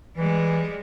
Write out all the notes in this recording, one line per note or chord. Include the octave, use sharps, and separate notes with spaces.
E3 G3 G#3